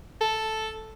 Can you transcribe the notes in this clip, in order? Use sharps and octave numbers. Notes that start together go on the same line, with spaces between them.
A4